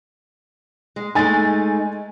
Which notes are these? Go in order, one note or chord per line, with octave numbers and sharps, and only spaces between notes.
G#3
G#3 A3 D#4 G#5 A6